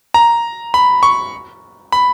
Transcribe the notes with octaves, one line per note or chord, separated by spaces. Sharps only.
A#5
B5
C#6
B5